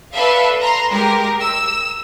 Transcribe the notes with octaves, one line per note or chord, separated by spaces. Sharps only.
A4 B4 D5 E5 F5
A#5 C6
G#3 G4 A#4
E6